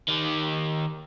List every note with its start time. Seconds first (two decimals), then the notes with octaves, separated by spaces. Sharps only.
0.08 D#3 G4